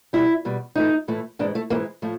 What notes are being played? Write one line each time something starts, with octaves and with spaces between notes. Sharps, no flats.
E2 B2 G3 E4
E2 B2 G3
A2 E3 A3 D#4
A2 E3 A3
G#2 E3 G#3 D4
A3
G#2 E3 G#3 A#3
A2 F3 A3